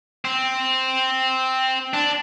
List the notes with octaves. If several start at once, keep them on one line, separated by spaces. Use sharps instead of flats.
C4
D4